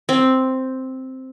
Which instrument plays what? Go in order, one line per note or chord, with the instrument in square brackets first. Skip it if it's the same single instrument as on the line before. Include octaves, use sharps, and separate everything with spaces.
[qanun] C4